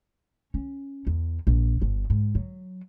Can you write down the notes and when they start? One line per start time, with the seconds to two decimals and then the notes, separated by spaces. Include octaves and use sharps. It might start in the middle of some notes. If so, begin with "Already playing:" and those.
0.54 C#4
1.07 E2
1.47 A#1
1.82 G1
2.10 G#2
2.35 F#3